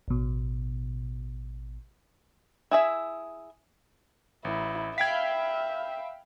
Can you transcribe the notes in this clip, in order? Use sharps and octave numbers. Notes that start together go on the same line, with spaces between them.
A1 B2
E4 G#4 E5
A1 E4
E5 F5 G5 B5 G#6 B6